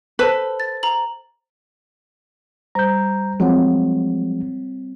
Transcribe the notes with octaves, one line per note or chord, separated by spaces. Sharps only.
A4 B4 C5 A5
A6
A#5 F#7
G3 C5 A#5 G6
F3 F#3 G#3 C4 C#5 F#5